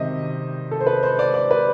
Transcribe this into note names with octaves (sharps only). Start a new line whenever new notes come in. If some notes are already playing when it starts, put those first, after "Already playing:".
Already playing: C3 D#3 G3 D#5 E5
A4
C5
B4
C5
D5
D5
B4